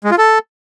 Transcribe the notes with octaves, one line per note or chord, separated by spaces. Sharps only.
G#3
F4
A4